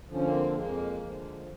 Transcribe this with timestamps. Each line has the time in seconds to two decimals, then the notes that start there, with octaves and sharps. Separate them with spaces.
0.09 D3 F3 C#4
0.24 A#3 C4
0.55 F2 G#3 A#3
1.02 D3 F3